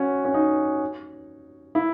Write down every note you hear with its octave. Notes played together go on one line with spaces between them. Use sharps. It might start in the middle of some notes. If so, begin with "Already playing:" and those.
Already playing: C#4 F#4
C#4
D#4
E4